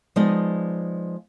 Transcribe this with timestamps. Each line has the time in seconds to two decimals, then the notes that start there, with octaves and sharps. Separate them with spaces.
0.16 F3 G#3 B3 D#4 D5 D#5